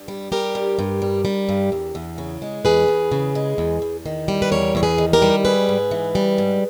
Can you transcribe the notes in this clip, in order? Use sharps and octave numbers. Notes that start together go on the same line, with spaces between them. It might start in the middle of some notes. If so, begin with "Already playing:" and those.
Already playing: G2
G3
G3 G4 A#4
G2
G2
G3
G3
G2
E2
E2
C#3
G#3
E2 G#4 B4
E2
C#3
G#3
E2
E2
D#3
G3
B4
E2 A#4 C#5
E2 C#5
G#4 B4
D#3
G4 A#4
G3
G#2 G#4 B4
G#2
E3
G3
G#2